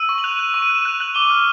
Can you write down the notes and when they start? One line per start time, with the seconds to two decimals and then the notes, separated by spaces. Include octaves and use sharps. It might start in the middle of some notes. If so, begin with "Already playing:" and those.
Already playing: E6 D#7
0.09 C#6
0.18 F#7
0.24 F#6 F7
0.39 F#6
0.54 C#6
0.62 D#7
0.69 F#6
0.75 E7
0.85 F#6 F7
1.00 F#6 F#7
1.15 D6 G7
1.30 F6